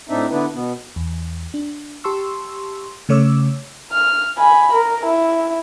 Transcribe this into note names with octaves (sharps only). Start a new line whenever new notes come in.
A2 C4 D4 D#4 E5
D3 B3 D4 E4 B4
B2 B3
E2
D4
G4 A5 C6 C#6 E6
C#3 A3 C#5 D6 E6
F6
G#5 B5
A#4
E4